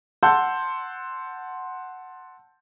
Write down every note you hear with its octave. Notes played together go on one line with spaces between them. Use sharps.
F#5 A5 C6 E6 G6